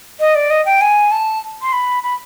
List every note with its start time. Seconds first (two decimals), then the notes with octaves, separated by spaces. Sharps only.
0.20 D#5
0.35 D5
0.50 D#5
0.65 G5
0.81 G#5
1.12 A5
1.62 C6
1.73 B5
2.03 B5